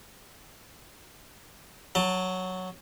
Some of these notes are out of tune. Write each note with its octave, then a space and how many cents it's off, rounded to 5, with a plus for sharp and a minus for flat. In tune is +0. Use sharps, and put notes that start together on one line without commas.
F#3 +0 A5 +20